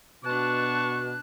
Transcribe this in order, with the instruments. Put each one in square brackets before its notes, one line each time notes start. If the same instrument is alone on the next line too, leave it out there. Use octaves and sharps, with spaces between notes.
[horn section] B2 [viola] D4 A5 [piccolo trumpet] C#6 [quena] F#6